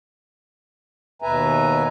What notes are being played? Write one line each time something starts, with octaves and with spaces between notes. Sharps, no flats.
D#2 B2 B4 E5 G#5 A#5